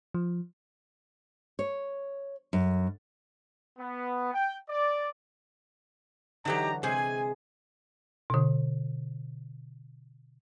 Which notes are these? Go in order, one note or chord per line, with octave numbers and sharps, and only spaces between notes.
F3
C#5
F#2
B3
G5
D5
D3 E3 F#3 D#4 G4 A#5
C3 G#3 G#4 C5 G#5
B2 D3